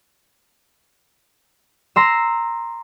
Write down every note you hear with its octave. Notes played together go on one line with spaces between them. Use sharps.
A#5 C6 E6